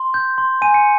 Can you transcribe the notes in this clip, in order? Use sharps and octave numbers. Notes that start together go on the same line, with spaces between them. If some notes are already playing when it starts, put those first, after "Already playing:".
Already playing: C6
G6
C6
G#5 D#7
C#7